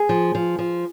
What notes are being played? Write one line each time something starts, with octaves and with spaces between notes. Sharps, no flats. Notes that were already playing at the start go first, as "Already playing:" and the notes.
Already playing: G#4
F3
F3
F3